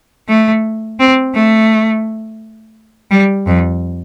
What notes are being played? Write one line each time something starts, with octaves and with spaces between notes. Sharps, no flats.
A3
C4
A3
G3
F2